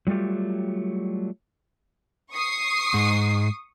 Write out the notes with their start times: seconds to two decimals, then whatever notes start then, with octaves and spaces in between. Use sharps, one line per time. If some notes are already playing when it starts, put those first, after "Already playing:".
0.07 F#3 G3 A3 F4 G4
2.32 C#6 D#6 C7
2.94 G#2